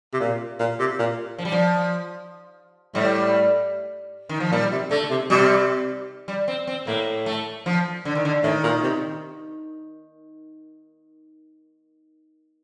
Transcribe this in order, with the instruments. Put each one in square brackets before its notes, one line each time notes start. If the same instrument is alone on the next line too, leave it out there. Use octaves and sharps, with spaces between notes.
[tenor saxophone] C3
A#2
A#2
C3
A#2
[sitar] F3
G3
F3
[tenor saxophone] A2 [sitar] G3
[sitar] D#3
F3
[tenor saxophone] A#2 [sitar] G3
[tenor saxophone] C3
[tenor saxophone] D3 [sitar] A3
[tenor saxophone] C3
[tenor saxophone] C3 [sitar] G3
[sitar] G3
C4
C4
[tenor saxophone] A2 [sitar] A#3
[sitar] A3
F3
D3
D#3
D3
[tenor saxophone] A2 [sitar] D#3
[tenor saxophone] A#2
C3